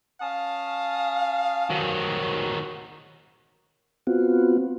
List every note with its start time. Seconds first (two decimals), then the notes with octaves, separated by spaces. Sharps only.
0.21 C#4 F5 A5 D#6
1.70 D#3 F#3 F#4
4.07 B3 C4 F4 F#4